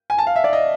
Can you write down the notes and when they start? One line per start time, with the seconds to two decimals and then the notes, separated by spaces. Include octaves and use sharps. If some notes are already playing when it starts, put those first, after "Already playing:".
0.10 G#5
0.18 A5
0.27 F5
0.36 E5
0.44 D5
0.53 D#5